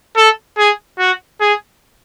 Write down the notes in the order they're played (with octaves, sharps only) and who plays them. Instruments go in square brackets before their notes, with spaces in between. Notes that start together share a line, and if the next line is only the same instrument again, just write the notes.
[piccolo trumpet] A4
G#4
F#4
G#4